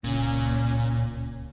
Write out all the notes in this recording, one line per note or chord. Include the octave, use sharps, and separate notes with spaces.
D1 C#2 A#2 C#4